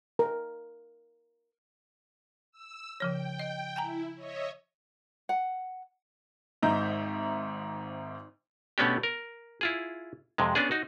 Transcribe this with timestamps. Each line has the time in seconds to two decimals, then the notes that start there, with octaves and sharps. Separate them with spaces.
0.19 A#4
2.52 E6
3.00 C#3 F3 C#5 G5
3.39 D#5
3.76 E4 G5 G#5 A#5
4.15 C#5 D#5 E5
5.29 F#5
6.62 G#1 G#2 D#5 E5 A#5 G6
8.78 B2 A3 B3 C#4 D4 G4
9.03 A#4
9.61 E4 F4 G#4
10.38 F2 C3 G#3
10.55 B3 C#4 D4 G#4
10.71 D#4 F#4